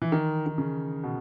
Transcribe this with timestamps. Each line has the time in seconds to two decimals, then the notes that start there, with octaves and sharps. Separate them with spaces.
0.02 E3
0.12 D#3
0.46 D#3
0.58 C#3
1.03 B2